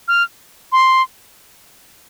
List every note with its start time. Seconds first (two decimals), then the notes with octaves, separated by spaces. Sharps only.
0.08 F6
0.72 C6